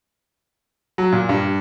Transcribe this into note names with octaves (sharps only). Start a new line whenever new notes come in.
F#3
A#2
G2